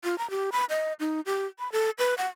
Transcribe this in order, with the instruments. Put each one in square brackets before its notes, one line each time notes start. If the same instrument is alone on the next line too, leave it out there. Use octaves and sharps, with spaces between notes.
[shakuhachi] F4
A#5
G4
B5
D#5
D#4
G4
B5
A4
B4
F#5